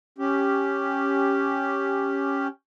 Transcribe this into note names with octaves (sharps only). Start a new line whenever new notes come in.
C#4 G4